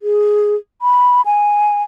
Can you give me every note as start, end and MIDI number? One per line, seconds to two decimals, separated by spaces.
0.01 0.56 68
0.82 1.22 83
1.26 1.82 80